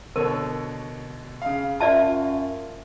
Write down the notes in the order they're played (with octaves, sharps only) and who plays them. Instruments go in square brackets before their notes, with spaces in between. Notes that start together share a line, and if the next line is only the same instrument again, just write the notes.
[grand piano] B2 D3 C#5 [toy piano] A#4
[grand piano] C#3 F5
[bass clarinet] F#2 [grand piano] F4 [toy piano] D5 E5 A5